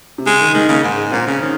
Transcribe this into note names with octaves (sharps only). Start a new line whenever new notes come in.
C3
C#3 G#3
D#3
D#3 G#3
C#3 A#3
G#2
A#2 C4
C#3
D#3 C#4